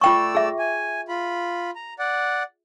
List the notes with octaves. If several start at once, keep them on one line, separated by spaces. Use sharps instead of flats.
A3 F4 D5 G5 C#6 E6
G#4 E5
G#5
F4 B5
A#5
D5 F#5